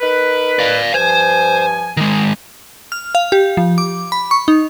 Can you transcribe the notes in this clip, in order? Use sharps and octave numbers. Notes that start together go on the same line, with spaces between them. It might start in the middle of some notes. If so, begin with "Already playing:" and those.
D#4 A#4 B4
D5 F5
G2 F3 C5 G#5
D#3 G#3
F6
F5
G4
F3
D6
B5
C#6
D#4